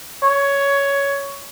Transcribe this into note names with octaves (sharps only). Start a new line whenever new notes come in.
C#5